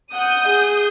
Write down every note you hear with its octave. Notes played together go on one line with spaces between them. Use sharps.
F#5 D#6 G6
G#4